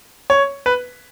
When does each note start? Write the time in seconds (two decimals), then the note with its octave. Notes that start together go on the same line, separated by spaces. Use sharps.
0.30 C#5
0.66 B4